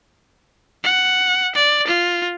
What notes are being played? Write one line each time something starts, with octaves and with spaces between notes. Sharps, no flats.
F#5
D5
F4